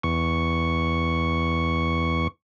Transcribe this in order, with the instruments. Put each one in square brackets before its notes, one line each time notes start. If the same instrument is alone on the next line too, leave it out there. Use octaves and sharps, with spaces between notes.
[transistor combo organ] E2 C#6